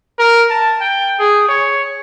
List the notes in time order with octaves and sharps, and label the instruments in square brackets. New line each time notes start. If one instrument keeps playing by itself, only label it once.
[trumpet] A#4
A5
G5
G#4
C#5